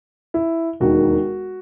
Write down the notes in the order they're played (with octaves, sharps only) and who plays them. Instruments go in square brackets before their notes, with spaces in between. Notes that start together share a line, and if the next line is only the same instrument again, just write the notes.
[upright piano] E4
E1 D#2 D#3 F#4